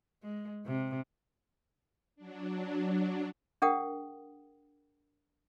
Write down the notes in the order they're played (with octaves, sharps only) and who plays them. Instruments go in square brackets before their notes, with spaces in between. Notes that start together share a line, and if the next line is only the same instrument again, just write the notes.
[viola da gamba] G#3
C3
[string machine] F#3 D4
[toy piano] D4 G#4 A#4 F#5 G5 D#6